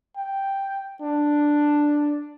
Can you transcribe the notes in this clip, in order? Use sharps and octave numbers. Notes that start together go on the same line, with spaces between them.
G5
D4